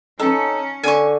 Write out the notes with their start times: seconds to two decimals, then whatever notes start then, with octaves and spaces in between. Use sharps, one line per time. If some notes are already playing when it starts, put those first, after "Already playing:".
0.20 C#4 D#4 A4
0.83 D3 G#5 C#6